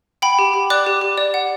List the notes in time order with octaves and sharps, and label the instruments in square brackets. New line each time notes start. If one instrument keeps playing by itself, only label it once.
[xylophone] F#5 G5 B5
G4
G4
D5 D6 F#6
G4
G4
D5
F#5